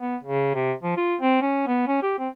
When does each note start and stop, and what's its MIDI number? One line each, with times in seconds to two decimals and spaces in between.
0.01 0.16 59
0.23 0.50 49
0.54 0.72 48
0.83 0.96 53
0.97 1.15 65
1.21 1.39 60
1.41 1.65 61
1.67 1.85 59
1.88 2.01 61
2.02 2.14 67
2.18 2.28 60